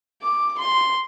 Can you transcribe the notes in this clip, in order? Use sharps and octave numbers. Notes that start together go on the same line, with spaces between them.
D6
C6